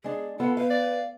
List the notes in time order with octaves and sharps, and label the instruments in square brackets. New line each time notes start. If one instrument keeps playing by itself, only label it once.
[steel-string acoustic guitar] G#3 D4 [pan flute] G#4
[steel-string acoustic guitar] B3 F4 A4 [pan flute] F#5
[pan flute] B4 [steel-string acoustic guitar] F5
[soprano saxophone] D5